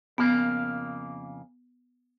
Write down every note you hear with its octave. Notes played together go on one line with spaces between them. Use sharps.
F2 C#3 A#3 B3